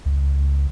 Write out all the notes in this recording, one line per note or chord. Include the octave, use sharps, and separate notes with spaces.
C#2